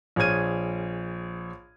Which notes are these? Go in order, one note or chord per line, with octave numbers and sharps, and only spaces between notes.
A#1 G#4 C#5 F6 G#6 D#7